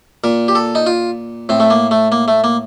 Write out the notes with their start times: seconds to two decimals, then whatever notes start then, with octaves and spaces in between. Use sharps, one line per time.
0.24 A#2 A#4
0.48 G4
0.55 A4
0.75 D#4
0.86 F4
1.49 A2 C4
1.60 A3
1.70 A#3
1.91 A3
2.12 A#3
2.28 A3
2.44 A#3